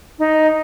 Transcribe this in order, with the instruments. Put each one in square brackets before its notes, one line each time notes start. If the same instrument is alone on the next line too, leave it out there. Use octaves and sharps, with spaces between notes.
[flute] D#4